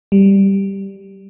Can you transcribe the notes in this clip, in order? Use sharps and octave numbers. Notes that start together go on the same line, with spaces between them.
G3